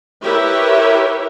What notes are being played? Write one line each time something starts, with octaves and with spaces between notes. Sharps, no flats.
E4 G4 A#4 B4 C#5 E5